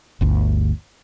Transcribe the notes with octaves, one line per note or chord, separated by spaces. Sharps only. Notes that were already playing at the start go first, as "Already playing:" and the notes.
G1 D2